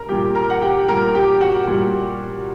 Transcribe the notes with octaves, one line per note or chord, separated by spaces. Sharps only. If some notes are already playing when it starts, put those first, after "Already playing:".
Already playing: A#4 A#5
A#2 G3 G4 G5
A#4 A#5
F#5
G4 G5
A#2 G3 A#4 A#5
G4 G5
F#4 F#5
A#2 G3